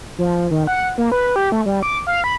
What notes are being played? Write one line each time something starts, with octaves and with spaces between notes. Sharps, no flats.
F3
D#3
F#5
A#3
B4
G4
A3
G3
D6
F5
B5